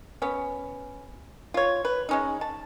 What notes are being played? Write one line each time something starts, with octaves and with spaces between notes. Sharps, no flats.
B3 C#4
F4 C#5
B4
G#3 C#4 D#4
A5